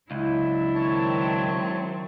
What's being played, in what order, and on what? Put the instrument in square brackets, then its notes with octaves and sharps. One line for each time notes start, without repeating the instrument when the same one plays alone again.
[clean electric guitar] C#2 [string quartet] F#3 [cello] D4 E4
[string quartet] D#3 F#3 C4 [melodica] C#5 A5